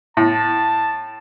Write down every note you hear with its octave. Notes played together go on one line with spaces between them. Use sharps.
A2 A5